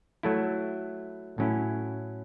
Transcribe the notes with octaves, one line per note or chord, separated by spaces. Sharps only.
F#3 A3 E4
A2 F#3 C#4 E4